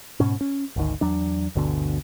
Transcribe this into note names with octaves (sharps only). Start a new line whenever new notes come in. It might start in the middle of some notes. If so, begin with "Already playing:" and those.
G#2 B2 C#4
C#4
G#1 D2 D#3
E2 F#3 D4
G1 D2 B2 D3